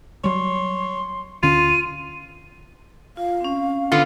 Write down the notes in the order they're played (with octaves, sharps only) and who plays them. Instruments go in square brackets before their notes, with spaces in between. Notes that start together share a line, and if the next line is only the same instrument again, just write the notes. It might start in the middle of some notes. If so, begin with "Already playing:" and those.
[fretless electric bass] F#3 G3 [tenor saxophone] C#5 [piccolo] C6
[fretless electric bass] D2 D3 C#4 [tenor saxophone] F4 [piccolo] D#7
[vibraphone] F4 [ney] F5
[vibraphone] C4 C#4
[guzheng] D3 B3 [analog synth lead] F4